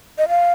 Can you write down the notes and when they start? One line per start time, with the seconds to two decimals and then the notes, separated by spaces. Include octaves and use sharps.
0.18 D#5
0.29 F5